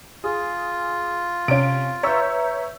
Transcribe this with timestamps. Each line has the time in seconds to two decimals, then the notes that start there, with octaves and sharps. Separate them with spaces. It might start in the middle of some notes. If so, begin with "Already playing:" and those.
0.24 F4 G#4
1.48 C3 C#4 F5 D7
2.03 B4 C#5 E5 A#5 C#6 E6 G6 B6